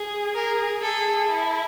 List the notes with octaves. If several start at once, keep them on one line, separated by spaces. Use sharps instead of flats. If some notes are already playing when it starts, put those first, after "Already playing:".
Already playing: G#4
G#4 A#4
G#4 A4
E4